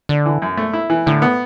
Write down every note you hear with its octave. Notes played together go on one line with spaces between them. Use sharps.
D3 D4
E3
F#2
A3
E4
E3
A2 D3
B3